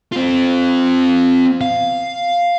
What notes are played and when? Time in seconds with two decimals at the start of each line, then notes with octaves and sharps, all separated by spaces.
0.12 C4 F4
1.61 F5